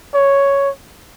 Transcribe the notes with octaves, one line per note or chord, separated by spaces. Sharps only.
C#5